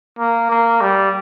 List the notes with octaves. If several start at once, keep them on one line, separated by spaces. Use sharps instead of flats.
A#3
A#3
G3